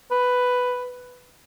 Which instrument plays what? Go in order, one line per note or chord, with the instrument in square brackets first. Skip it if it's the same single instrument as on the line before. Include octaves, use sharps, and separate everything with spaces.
[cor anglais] B4